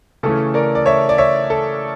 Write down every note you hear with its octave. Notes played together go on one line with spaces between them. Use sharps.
C#3 E3 A3 C#4 A4
A#4 D5
D5
C#5 E5
D5
C#5 E5
A4